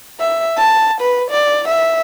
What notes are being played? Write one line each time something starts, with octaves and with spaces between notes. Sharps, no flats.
E5
A5
B4
D5
E5